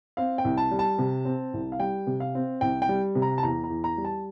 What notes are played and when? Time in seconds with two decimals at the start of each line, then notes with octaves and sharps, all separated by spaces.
0.17 C4 F5
0.38 G5
0.44 C2
0.57 A5
0.71 G3
0.79 A5
0.98 C3
1.25 C4
1.53 C2
1.72 F5
1.80 G3 G5
2.07 C3
2.20 F5
2.35 C4
2.61 C2 G5
2.82 G5
2.89 G3
3.15 C3
3.22 A#5
3.38 A5
3.43 E2 A#5
3.64 A#5
3.70 E2
3.84 A#5
3.98 G3
4.05 A5